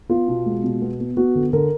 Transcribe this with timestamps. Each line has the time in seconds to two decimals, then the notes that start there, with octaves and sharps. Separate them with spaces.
0.10 B3 F4
0.28 B2
0.46 G#3
0.64 B2
0.82 B3
1.00 B3
1.17 B3 F#4
1.35 D3
1.53 D3 A#4